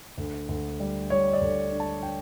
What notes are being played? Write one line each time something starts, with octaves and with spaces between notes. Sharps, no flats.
D2
D2
G3
G3 C#5
D5
D2
D4
A5
D4 G5